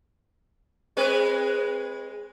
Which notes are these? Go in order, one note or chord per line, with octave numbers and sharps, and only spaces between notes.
G#3 C4 B4